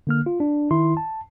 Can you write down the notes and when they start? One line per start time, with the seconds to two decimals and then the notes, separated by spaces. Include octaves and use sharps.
0.07 D3 A#3 F6
0.26 F4
0.40 D4
0.71 D#3 E4 C6
0.97 A5